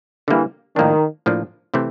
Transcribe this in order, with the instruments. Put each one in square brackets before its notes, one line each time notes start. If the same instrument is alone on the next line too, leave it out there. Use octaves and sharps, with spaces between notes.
[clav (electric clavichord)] D3 G3 A#3 [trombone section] E3
[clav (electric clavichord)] A2 F3 A#3 D4 [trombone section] D#3
[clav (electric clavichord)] A2 F3 A#3 D4
C3 E3 A3 C4 E4